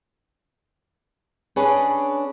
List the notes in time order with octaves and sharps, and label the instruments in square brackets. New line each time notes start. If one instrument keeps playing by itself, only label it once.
[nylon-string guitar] C#4 D4 G#4 B4 C#5 D5